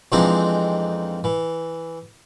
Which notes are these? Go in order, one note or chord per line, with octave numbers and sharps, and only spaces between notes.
F2 E3 G#3 C4 D4 D#4
E3